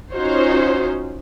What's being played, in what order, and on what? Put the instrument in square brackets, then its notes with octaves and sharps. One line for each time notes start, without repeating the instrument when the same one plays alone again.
[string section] C#4 D#4 F4 F#4 C5 C#5